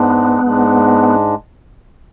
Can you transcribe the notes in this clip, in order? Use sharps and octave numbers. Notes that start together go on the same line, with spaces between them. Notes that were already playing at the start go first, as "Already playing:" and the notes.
Already playing: G#2 G#3 B3 D4
G#2 G#3 D4